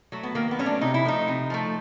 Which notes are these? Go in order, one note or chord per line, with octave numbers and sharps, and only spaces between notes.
F#3 A3
B3
D#3 A#3
B3
F#3 A3 C#4
D4
C3 D#4
E4
F3 A3 D#4
C3
F3 A3